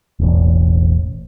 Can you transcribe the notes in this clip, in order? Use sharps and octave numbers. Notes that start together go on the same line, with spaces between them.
E1 A1